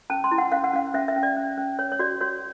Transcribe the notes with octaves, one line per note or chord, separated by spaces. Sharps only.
C#4 A5
C6
E4
F#5
C#4 F5
F#5
C#4 F5
C#4 E5
E5
C#4
D5
C#4
C#4
C#5
C#5
F#4 D5
F#4 C#5